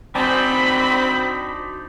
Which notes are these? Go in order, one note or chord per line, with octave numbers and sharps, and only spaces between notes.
C4 D4 D#4 F#4 C5 D5 G#5 B5